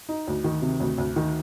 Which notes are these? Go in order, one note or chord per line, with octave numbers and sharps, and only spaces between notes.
D#4
D2
D#3
C3
D2
D2
D#3